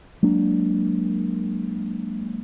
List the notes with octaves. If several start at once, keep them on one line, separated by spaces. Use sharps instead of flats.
F#3 G#3 A#3 D4